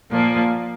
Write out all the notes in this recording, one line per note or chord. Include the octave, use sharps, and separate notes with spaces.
A#2 F3 A#3